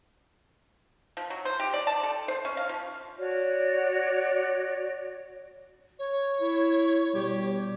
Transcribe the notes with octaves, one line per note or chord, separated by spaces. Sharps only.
F3
F#3
C5
G4
D5
A5
A4
C5
C#4
F5
F3
F#4 C#5 D5
C#5
E4
B2 G3 G4